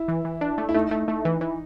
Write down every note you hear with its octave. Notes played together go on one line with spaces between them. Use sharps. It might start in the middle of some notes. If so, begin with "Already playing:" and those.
Already playing: E4
E3
E3
D4
A3
E4
A3 D#4
A3
A3
E3
E3